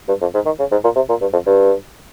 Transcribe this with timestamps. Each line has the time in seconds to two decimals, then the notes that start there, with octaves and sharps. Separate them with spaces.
0.08 G2
0.22 F2
0.35 G#2
0.46 D#3
0.59 C#3
0.72 G#2
0.84 A#2
0.96 C3
1.09 A#2
1.22 G2
1.33 F2
1.47 G2